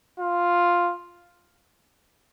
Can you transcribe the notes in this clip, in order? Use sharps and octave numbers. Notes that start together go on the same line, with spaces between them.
F4